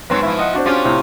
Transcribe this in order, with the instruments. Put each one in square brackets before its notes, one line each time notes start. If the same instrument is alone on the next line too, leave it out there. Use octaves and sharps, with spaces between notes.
[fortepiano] G#2 B3 [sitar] F#3 C4
[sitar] F3 E4
[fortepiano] D#5 F#5
C4 D4 F#4
[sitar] C#4 F4 G4
[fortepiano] A2 C3